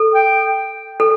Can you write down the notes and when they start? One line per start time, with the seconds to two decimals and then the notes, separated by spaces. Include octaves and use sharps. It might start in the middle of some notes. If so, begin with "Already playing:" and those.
Already playing: A4
0.14 G5
1.00 A4